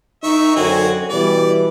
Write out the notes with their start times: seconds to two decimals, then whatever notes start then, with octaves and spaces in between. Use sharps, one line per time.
0.23 D#3 D#4 E5 C#6
0.56 F#2 D3 C4 F#4 G#5
1.10 B2 E3 G3 D5